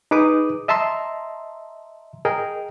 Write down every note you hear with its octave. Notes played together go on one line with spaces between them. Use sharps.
D#4 G#4 B4 D6 D#6
D#5 E5 A5 A#5 C6 E6
G#4 A#4 D#5 G5